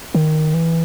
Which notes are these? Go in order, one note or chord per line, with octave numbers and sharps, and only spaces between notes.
D#3
E3